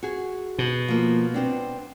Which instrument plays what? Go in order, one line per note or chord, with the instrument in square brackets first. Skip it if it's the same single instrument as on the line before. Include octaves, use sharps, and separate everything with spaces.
[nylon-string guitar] F#4 G#4
[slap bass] B2
[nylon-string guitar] F3 A#3
B3 C4 D4